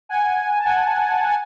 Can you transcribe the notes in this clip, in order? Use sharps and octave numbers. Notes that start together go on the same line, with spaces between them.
F#5 G#5
G#5
A5
F#5 G#5
G#5